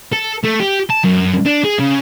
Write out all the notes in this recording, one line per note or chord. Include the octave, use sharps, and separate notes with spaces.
A4
A3
G4
A5
F#2
D4
G#4
C#3